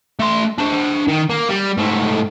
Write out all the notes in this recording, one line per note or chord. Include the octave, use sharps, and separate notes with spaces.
A3 C6
D4 C5
D#3
A#3
G3
G#2 A3